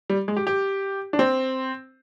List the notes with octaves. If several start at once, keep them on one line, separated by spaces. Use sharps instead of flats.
G3
G#3
G4
G4
D4
C4